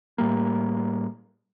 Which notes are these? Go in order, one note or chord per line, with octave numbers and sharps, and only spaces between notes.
A2 G3 A#3